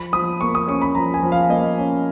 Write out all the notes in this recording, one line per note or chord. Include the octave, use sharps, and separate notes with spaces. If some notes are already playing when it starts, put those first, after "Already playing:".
Already playing: F3 B5
F3 D#6
A#3 C#6
D#6
C#4 C#6
B5
F3 A#5
G#5
F3
F5
A#3 D#5
C#4